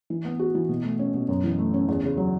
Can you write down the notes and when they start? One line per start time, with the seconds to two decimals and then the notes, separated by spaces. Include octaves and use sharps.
0.10 E3
0.25 B3
0.39 F#4
0.55 E3
0.69 B2
0.84 A3
0.99 C#4
1.14 B2
1.29 F#2
1.44 E3
1.58 A3
1.74 C#4
1.88 E2
2.03 C#3
2.17 F#3